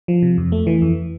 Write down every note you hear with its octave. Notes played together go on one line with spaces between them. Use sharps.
F3
C3
F2
A3
E3
F2